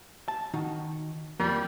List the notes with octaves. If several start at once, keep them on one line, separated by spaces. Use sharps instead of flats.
A5
D#3 D#4 F#4
F2 F3 G3 A#3